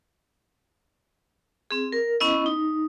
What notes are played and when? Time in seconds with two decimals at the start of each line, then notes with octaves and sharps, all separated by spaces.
1.71 C4 G#4
1.92 A#4
2.20 B3 C#4 E4 D#5
2.46 D#4